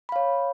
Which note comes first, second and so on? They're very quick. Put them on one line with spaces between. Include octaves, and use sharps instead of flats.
B5 F5 C#5